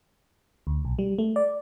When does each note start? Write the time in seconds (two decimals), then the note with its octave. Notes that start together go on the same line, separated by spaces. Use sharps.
0.67 D2
0.85 B1
0.99 G3
1.18 A3
1.36 D5